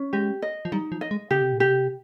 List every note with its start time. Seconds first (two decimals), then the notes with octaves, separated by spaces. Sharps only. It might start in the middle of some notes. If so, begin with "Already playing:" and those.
Already playing: C#4
0.13 G#3 G4
0.42 D#5
0.65 F3
0.72 G3 D#4
0.92 F3
1.01 D#5
1.11 G#3
1.31 C#3 G4
1.41 C3
1.52 A#2
1.60 C3 G4